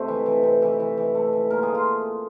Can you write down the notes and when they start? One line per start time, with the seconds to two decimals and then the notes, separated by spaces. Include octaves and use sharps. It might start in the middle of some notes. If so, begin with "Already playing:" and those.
Already playing: C3 A3
0.08 E3
0.26 E3
0.43 C3
0.62 E3
0.80 E3
0.97 E3
1.15 A3
1.33 E3
1.50 A#2 A#4
1.63 G#4
1.69 A3
1.75 F4